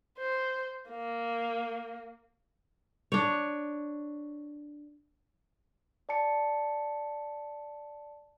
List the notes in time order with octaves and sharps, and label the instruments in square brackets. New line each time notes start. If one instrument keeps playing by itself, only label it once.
[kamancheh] C5
A#3
[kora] D4 C#5
[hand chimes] D5 A5 C#7